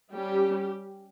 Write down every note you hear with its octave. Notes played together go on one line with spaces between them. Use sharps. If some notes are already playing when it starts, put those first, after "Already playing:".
G3 C#4 G4